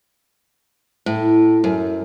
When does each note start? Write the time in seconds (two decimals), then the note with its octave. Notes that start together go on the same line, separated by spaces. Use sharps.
1.06 A2
1.64 F#2